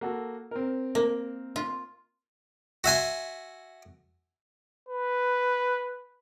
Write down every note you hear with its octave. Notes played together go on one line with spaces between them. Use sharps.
A#3 F#4 A4
C4 A#4
A#3
F4
F#4 E5 G#5 C6
B4